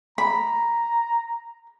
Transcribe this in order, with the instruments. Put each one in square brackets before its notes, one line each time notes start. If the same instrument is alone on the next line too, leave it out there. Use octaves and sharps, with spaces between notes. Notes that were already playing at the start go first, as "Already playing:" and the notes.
[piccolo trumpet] A#5 [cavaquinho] B5